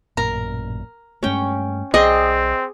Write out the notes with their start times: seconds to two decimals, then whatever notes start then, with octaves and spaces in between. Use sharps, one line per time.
0.17 A1 F#2 A#2 A#4
1.23 G2 G#3 A3 C#4 G5
1.94 B1 C4 G#4 D5 D#5 G5